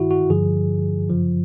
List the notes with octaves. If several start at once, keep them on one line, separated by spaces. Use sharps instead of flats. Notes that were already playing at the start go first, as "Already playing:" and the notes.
Already playing: G2 D#3 E4 F#4
F#4
G2 D3 F3 G#4
F#2 C#3 F3